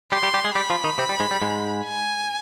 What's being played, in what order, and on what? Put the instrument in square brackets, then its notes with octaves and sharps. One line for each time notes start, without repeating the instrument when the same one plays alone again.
[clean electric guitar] G3 G4 [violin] C6
[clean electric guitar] G3 G4
G3 G4
G#3 G#4
[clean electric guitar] G3 G4 [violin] B5
[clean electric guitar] F3 F4
D#3 D#4
C3 C4
G3
G#2 G#3
G3
G#2 G#3
[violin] G#5